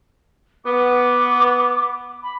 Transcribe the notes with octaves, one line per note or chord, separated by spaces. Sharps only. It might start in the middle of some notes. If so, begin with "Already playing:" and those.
B3 D6
B5